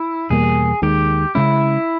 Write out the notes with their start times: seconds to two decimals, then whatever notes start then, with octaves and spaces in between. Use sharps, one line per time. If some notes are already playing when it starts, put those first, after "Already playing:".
Already playing: E4
0.30 E2 B2 G3 A#3 G#4
0.82 D#2 D#3 G#3 G4
1.35 C#3 G#3 C#4 E4